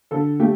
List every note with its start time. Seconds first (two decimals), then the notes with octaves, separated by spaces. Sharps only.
0.11 D3 A4
0.40 A3 G4